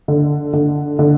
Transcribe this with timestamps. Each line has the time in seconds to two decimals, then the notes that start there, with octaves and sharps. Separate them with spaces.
0.08 D3
0.53 D3
0.99 D3